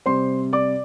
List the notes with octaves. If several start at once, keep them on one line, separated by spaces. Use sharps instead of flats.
C3 G3 C4 C5 C6
D5 D6